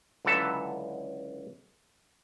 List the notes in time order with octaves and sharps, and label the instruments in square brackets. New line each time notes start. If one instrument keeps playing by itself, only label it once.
[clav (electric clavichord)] C#2 D3 E3 F#3 A4 E5